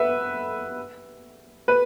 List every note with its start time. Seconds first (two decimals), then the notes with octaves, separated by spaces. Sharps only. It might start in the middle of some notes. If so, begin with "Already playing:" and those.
Already playing: B4 E5 F#5
1.68 B4